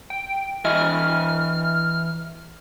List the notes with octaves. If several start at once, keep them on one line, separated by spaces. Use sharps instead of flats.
G5
E3 D#5 E5 F6